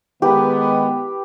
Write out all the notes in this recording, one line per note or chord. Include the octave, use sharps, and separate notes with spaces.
D#3 G#3 B3 G4 B4